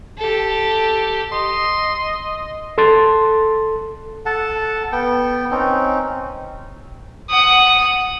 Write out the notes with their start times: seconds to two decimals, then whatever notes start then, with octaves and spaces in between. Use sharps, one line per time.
0.18 G4 A4
1.32 D#5 C6
2.78 A4 C6 A6
4.26 A4 F#5 A5
4.92 B3 G5
5.51 C4 C#4 D#4
7.30 F#5 D#6